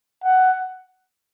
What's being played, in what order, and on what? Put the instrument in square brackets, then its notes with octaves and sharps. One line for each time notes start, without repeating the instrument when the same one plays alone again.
[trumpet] F#5